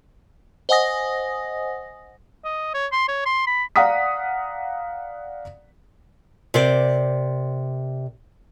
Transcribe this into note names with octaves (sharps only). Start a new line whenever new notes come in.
C5 D#5 F#5 G#5 D#6 A#6
D#5
C#5
C6
C#5
C6
B5
D5 F5 F#5 A#5 D#6 B6
C3 A#4 C5 D5